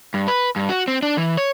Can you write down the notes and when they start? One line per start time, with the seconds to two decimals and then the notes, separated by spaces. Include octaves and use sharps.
0.14 G2
0.28 B4
0.56 G2
0.69 F#4
0.88 C4
1.02 D4
1.17 E3
1.37 C#5